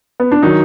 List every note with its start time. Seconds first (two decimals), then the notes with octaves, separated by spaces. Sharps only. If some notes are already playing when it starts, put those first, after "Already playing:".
0.20 B3
0.32 D4
0.43 D#3 F#3 D#4